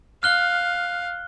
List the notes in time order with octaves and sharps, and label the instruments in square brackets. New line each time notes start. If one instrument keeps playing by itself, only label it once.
[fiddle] F5 [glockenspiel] F6 F#6 G7